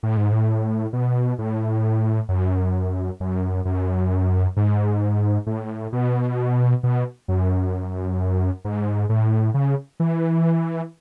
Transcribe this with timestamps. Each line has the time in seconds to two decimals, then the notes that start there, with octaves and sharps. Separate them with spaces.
0.03 A2
0.17 G#2
0.32 A2
0.93 B2
1.39 A2
2.29 F#2
3.20 F#2
3.65 F#2
4.57 G#2
5.47 A2
5.93 B2
6.83 B2
7.28 F#2
8.65 G#2
9.09 A2
9.54 C#3
10.00 E3